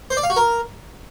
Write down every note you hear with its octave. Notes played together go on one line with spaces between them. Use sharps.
C5
D5
F5
F#4
A#4